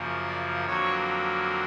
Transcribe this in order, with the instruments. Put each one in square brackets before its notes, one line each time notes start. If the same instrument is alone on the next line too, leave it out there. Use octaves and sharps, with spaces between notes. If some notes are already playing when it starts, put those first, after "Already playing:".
Already playing: [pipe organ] F#2 C#3 F3 A#3
D5
F2 D3 F#3 A#3 C#5